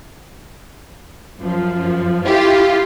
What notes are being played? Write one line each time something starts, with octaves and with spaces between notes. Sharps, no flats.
F#2 F3
E4 F4 G4